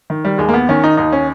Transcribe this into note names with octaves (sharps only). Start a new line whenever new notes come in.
D#3
G3
D#2 G#3
A#3
B3
D#3 C#4
D#4
D#2 D#4
C#4